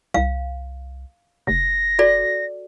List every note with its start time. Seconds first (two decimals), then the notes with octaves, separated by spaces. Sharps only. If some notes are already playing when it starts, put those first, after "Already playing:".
0.14 C2 F5
1.47 F1 A#6
1.99 F#4 A4 D5